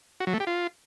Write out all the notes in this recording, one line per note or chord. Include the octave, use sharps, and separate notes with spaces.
F#4
F#3
A3
G4
F4